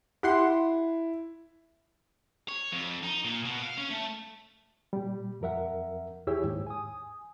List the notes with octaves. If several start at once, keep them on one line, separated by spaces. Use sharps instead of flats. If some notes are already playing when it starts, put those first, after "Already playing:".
E4 G4 F#5 C6
C#5
F2
D#4
A#2
B2
F5
C#4
A3
A#2 G3
F2 F3 A#4 E5 F#5
E2 E4 G4 G#4 C#5 E6
D#2 G#2
G#5 D#6